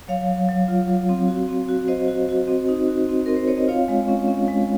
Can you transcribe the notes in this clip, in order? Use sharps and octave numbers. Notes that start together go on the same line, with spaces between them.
F#3 C#5 F5
F#3
F#3
F4
F#3
C4
F#4
C4
F#4
F#4 C5 D#5
F#4
F#4
C4
D#4
F#4
C4
C4 A#4
C5
C4 C#5
D#5
F4 C#5 F5
G#3
C#4
C#4
G#3